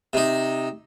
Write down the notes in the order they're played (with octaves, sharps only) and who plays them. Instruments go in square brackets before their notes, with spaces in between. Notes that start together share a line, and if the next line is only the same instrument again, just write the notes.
[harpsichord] C3 D#4